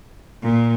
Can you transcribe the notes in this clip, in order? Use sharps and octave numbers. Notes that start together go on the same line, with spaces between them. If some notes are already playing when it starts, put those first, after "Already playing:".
A#2